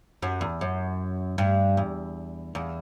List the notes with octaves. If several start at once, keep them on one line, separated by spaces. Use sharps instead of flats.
F#2
E2
F#2
G2
E2
E2